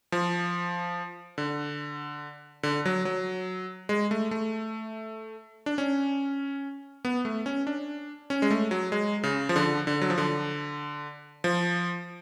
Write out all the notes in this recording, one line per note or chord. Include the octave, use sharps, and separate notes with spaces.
F3
D3
D3
F#3
F#3
G#3
A3
A3
D4
C#4
B3
A3
C#4
D4
C#4
G#3
A3
F#3
G#3
C#3
F3
D3
D3
F#3
F3
D3
F3